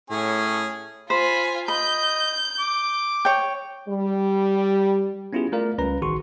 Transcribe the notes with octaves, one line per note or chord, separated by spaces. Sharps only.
A2 C#4 G#4 C#6
F4 C5 G#5 B5
D#5 B5 G6
D6
C#5 G5
G3
B3 C#4 E4 F4 G4 G#4
A3 F4 A#4 D5 F5
C#2 G3 C#4 B4 A#5
A1 D#3 F#4 G#4 C6 C#6